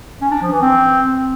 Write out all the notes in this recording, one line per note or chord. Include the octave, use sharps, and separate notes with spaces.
C#4
D4
F3
E3
C4